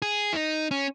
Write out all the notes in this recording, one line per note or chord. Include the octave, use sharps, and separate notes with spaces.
G#4
E4
D#4
C#4